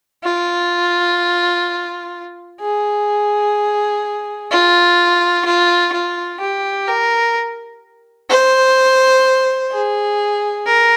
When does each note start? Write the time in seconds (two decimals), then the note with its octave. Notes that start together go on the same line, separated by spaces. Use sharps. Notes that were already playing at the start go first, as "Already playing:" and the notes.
0.24 F4
2.61 G#4
4.51 F4
5.45 F4
5.93 F4
6.40 G4
6.87 A#4
8.30 C5
9.72 G#4
10.66 A#4